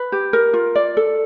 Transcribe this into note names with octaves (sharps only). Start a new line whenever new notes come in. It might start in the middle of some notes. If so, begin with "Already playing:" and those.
Already playing: B4
G4
A#4
F4
D5
A4